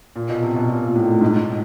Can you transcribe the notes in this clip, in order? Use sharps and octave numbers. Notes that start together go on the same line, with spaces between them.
A#2
B2
C3
B2
A#2
A#2
A2
G#2